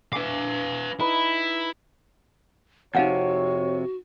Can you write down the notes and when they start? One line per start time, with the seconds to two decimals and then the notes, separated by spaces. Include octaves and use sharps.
0.12 B4 E5 F5 G#5 D6
1.00 D#4 E4 B4
2.95 F2 C3 D#4 F#4 C#5 F5 F#5